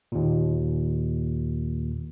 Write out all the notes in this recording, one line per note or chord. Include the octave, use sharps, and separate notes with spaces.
D#2 A#2